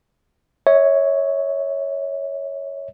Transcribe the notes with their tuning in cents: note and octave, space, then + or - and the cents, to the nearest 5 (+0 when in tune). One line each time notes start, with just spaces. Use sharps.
C#5 +0 E5 -40